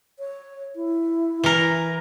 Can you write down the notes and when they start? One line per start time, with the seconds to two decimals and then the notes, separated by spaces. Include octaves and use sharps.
0.19 C#5
0.76 E4
1.44 E3 A#4